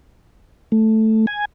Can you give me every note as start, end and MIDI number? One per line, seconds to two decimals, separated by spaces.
0.72 1.26 57
1.27 1.45 80